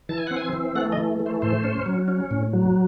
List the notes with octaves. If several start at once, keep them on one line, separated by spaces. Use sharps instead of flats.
E3 A5
G#5
C4 F#5
G#5
E3
A3 F#5
D#5
E3
A3
C5
A2 C5
C#4
F#3
C#4
A2
F#3